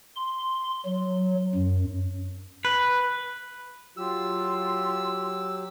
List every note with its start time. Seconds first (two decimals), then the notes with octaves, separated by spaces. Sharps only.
0.16 C6
0.85 F#3
1.55 F#2
2.65 B4
3.97 F#3 F4 G4 E6